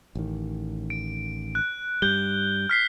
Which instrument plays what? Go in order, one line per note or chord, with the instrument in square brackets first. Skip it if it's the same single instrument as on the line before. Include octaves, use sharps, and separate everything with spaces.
[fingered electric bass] A1 D#3
[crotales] D7
F#6
[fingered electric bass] G2 G3 [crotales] G6 G7
[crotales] F6 B6 C7